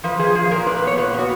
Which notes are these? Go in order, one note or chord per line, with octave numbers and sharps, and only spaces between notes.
F3 B4
F3 G#4
F3 G#4
A#2 A#4
A#2 B4
B4
B3 C#5
A#2 B4
B3 F#4